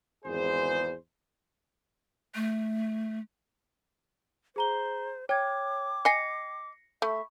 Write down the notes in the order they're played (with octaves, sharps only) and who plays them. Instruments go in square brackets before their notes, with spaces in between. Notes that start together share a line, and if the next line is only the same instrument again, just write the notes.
[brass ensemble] G#1 E2 G#4 C5
[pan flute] A3
[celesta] G#4 A#5 G7 [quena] C5
[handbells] C#5 [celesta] G5 G#6 [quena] D6
[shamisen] D#5 G#5 [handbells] A#6 C7 C#7
[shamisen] A3 [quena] E5 [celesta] B5 C#6